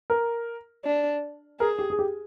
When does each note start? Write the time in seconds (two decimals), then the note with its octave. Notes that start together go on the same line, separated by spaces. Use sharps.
0.10 A#4
0.85 D4
1.60 G#4 A#4
1.79 G4
1.90 G#4
1.99 G4